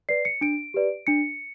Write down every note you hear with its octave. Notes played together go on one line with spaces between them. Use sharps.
B4 D5 C7
C#7
D4 D7
G4 B4 D5
D4 C#7